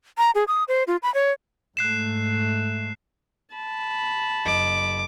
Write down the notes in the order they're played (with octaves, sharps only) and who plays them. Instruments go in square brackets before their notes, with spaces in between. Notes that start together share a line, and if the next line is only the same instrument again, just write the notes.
[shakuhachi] A#5
G#4
D#6
C5
F4
B5
C#5
[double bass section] G#2 A3 [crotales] F#6 C7 E7
[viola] A5 B5
[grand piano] F#1 D#5 [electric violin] D6